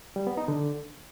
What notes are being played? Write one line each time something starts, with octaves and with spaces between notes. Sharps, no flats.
G3
B3
D#4
D3